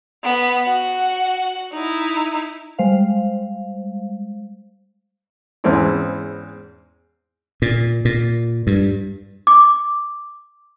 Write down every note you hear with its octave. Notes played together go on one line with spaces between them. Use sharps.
B3
F#4 F#5
D#4 E4
G3 G#3 C5 F5
E2 G#2 G#3 C4 C#4 E4
A#2
A#2
G2
D6